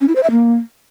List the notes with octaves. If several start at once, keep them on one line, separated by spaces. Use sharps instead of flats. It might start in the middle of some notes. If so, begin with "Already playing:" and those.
C#4
E4
C5
E5
A#3